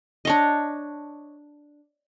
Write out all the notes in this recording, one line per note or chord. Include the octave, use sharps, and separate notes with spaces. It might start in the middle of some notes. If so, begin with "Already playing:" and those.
D4 C#5 D#5